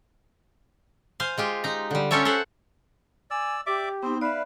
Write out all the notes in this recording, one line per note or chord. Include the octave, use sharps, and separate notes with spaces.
C5 F5 G#5
G#3 F4 G4
D#4 A#5
D3 G3
C#4 F4 G4 A4 C#5 E5
A4 C5 E5 F#5
D5 G#5 E6
G4 D5 E5 D6
B3 C4 D#4 C5
B4 D5 E5 F5 B5